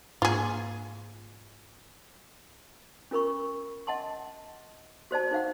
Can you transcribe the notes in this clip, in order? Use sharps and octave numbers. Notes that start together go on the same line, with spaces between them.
G#2 A#3 F4 G#4
C#4 F4 A#4 B5 C#6
D#5 F#5 A5 C6
F#4 C5 D5 A5
D#4 C5 F5 F#5